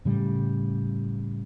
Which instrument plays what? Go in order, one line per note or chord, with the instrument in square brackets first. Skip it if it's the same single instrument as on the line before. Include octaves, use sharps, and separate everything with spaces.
[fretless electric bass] A2 C#3 G3